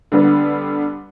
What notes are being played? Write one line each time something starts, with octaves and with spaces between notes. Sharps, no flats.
D3 G3 B3